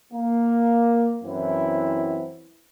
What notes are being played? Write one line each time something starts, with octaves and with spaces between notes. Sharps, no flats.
A#3
F#2 E3 C4 E4